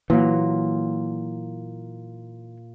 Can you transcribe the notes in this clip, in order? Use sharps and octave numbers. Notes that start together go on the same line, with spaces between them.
A#2 E3 F#3